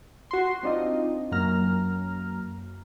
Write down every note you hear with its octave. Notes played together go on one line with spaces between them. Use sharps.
F#4 C6
C4 D4 D#4 F4 D#5
F#2 F#3 A#3 A#5 F6